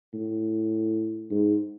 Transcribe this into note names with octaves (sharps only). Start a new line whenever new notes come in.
A2
G#2